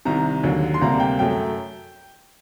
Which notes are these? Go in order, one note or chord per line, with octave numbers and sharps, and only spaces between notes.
C2 C3 D#3 A#5
D#2 D3 F#3
C6
D2 C3 G3 A#3 A#5
G5
F#2 F#3 A3 G5